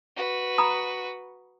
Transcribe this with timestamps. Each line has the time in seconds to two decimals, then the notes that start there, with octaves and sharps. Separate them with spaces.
0.17 F#4 B4
0.58 A#5 B5 D#6